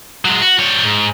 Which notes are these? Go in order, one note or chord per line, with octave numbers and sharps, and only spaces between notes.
F#3 G#3
F#4
G3 C#5
G#2